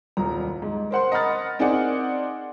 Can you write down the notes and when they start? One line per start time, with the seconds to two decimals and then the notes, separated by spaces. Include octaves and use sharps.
0.17 D#1 C2 A#5
0.62 G#2
0.91 A#4 C5 F#5 C6
1.12 D#5 F#5 A#5 B5 F6 A6
1.59 C4 D#4 G#4 A#4 D5 F#5